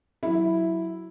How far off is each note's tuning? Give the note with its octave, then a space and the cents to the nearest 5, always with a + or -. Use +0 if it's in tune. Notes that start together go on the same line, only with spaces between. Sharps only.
F#3 +0 E4 +0